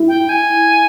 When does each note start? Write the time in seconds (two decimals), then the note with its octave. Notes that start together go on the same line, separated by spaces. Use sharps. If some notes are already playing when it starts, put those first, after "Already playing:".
Already playing: E4
0.08 G5
0.29 G#5